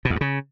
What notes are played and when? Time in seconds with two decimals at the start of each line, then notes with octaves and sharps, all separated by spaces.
0.05 B2
0.10 E2
0.16 G2
0.21 C#3